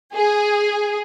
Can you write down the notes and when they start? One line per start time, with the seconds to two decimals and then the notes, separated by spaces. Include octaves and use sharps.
0.14 G#4